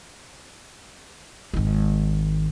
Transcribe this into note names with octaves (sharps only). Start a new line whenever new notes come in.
G#1 D#3